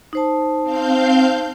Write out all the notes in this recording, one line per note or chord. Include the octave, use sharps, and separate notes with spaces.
D#4 C5 A5
C4 F5 G6